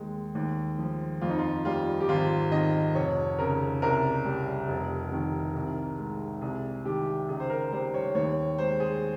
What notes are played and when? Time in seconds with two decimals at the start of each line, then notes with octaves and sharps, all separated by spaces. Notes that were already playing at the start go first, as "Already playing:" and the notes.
Already playing: D#2 D#3 G#3
0.35 D#2
0.78 F3
1.21 F2 F4
1.30 D#4
1.39 F4
1.65 G3 F4
2.00 G4
2.08 G#1 F4
2.51 D#3 D#5
2.95 F1 C#5
3.39 C#3 A#4
3.82 C2 A#4
4.25 G3
4.69 F1
5.12 D#3
5.56 C2
5.99 G#3
6.42 C2 G#4
6.85 D#3 G4
7.29 C#2 G#4
7.40 C5
7.50 A#4
7.72 G3 C5
7.94 C#5
8.15 D#2 C#5
8.58 G#3 C5
8.80 G#4